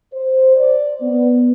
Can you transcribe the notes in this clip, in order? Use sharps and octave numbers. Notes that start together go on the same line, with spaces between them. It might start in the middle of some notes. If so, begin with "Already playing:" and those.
C5
D5
B3